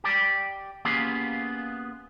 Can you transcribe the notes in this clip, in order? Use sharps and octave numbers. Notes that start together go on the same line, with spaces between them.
G4 D5
A#3 B3 C#4 F4 G4 G#4